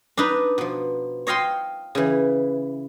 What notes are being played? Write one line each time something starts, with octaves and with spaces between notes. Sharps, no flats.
D4 D#4 B4
B2 F3
C#5 D#5 F5 G5 C6
C#3 E3